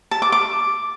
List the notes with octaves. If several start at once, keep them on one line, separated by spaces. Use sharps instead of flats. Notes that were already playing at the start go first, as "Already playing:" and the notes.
A5
D6
D6